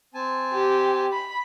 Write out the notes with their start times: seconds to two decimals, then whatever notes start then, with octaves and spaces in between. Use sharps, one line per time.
0.14 C4 G#5 A5
0.53 G4
1.13 B5